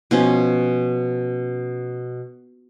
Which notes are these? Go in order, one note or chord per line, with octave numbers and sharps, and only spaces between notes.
B2 F3 C#4